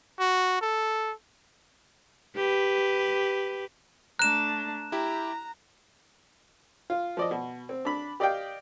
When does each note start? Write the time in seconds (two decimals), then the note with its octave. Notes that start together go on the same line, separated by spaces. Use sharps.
0.19 F#4
0.61 A4
2.36 G4 B4
4.19 A3 D4 A#5 F#6 E7
4.92 E4 G4 A#5
6.90 F4
7.17 F3 D5 D#5
7.31 B2
7.69 C4
7.85 D4 B5
8.20 G4 D5 D#5 F5 G5